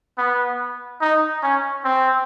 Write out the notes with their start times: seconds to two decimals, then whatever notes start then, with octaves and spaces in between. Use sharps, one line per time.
0.18 B3
1.01 D#4
1.43 C#4
1.85 C4